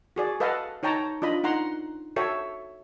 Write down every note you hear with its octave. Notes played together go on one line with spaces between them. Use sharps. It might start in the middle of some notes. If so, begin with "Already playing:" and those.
F#4 G#4 D5
A4 B4 D#5 F5 F#5 A5
D#4 C#5 G5 A5 A#5
D4 F4 D#5 B5
D#4 F#5 A#5 C6
F#4 A4 C#5 E5 G5